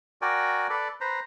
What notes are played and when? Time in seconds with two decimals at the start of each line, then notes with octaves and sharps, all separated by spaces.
0.22 F#4 A#4 D5 G5 G#5
0.70 A4 B4 D5
1.01 B4 C5 A#5